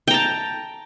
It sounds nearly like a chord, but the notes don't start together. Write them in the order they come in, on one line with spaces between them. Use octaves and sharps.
G5 A#5 A5